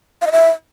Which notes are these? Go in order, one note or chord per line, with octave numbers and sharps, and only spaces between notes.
F5
D#5
E5